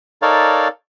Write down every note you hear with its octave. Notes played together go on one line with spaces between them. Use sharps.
D#4 A4 A#4 C#5 D5 F5